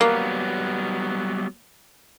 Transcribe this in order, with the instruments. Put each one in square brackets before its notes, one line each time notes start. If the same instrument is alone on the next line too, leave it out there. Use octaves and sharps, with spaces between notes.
[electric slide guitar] F#3 G3 B3 [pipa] A#3